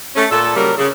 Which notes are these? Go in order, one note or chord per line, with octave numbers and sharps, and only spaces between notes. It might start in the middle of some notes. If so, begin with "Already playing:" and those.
A3 C#4
A#2 A4
C#3 F#3 G3 A#3 A#4
C#3